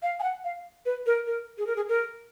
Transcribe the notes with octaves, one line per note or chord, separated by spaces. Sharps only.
F5
G#5
F#5
F5
B4
A#4
A#4
G#4
A#4
G#4
A#4